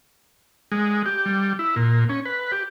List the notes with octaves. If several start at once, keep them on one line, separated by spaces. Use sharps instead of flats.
G#3
G4
G3
E4
A#2
C#4
B4
G4